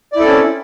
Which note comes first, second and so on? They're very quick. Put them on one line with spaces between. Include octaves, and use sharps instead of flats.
D5 E4 A4 C4 C#4